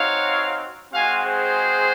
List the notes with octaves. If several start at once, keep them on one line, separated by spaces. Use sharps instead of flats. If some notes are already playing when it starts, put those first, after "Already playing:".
Already playing: C4 D#4 F#4 C#5 F5
G#3 C4 F#4 F5 G#5
G#4 C5